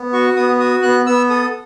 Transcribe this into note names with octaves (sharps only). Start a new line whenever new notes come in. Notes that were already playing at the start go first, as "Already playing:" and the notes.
Already playing: B3
F#4 C#6
B3 D#6
F#4 D#6
B3 F#6
B3 E6
A4 D#6